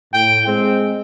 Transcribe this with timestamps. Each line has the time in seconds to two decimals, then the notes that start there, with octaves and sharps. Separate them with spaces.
0.13 A2 G5
0.47 G#3 C4